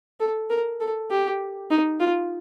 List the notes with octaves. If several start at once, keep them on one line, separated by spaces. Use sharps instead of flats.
A4
A#4
A4
G4
D#4
F4